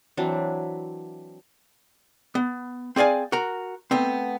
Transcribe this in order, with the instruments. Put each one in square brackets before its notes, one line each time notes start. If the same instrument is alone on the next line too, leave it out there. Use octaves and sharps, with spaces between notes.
[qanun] E3 F#3 C4 D4
[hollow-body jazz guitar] B3
C4 G#4 D5 F5 G#5
F#4 A#4
A3 B3 C4